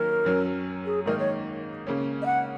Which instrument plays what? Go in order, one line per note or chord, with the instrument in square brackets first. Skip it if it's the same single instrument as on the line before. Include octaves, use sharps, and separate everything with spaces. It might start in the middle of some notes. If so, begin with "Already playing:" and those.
Already playing: [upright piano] D#3 F#3 A#3 C#4 [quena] A#4
[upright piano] F#2 F#3 C#4
[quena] G#4
[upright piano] G#2 D#3 A#3 D#4 [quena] A#4
[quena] C#5
[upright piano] C#3 A#3 C#4
[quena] D#5
F#5